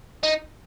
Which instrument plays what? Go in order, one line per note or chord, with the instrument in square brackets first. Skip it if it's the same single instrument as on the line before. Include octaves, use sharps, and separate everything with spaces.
[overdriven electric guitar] D#4